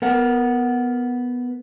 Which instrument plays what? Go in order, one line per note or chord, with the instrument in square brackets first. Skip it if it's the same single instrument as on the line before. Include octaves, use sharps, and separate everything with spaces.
[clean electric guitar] B3 A#4 F#5